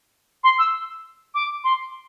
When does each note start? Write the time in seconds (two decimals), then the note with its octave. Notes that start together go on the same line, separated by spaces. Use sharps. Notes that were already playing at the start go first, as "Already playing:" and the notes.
0.43 C6
0.58 E6
1.34 D6
1.63 C6